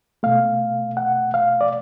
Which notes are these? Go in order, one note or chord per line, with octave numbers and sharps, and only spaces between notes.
B2 A3 F5
F#5
F5
D5